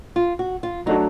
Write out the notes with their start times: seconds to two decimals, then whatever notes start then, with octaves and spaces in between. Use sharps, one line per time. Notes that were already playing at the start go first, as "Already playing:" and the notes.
0.16 F4
0.39 F#4
0.63 F4
0.86 F#3 A3 D4 D#4 F#4